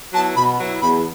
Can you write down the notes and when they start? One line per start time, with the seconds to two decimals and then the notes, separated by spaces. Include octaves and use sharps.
0.14 F#3 B3 E4 A5
0.36 B2 B5
0.59 F#3 B3 E4
0.82 E2 B5